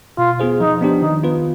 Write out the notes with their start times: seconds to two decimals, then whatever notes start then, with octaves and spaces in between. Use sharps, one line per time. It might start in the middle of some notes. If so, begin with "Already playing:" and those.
0.18 B2 F4
0.40 B3 F4 G#4 C5
0.60 F3 D#4
0.81 B3 D4 G4 C5
1.02 D#3 D#4
1.23 B3 F4 B4